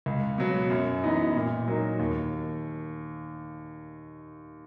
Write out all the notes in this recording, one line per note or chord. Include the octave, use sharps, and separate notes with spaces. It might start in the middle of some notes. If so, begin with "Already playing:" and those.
C#2
B2 F#3 B3
F#2
E3 B3 D#4
A#2
F#3 A#3 D#4
D#2